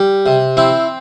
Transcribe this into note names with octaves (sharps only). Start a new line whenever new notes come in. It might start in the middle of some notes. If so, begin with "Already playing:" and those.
Already playing: G3
C3
C4 E4